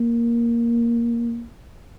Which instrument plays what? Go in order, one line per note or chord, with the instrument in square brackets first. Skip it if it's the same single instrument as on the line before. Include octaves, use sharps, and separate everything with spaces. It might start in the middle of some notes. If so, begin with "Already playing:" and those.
Already playing: [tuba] A#3